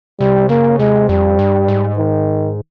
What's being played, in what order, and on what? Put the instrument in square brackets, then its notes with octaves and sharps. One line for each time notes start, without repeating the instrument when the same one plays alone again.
[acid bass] C3 [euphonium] G3
[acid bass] C#3 [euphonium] A#3
[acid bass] C3 [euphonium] G#3
[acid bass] F2 [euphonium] G3
[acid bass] G2
G#2
[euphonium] D#3